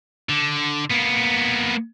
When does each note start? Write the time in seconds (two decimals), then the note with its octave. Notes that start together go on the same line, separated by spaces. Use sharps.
0.29 D3
0.90 A#3 B3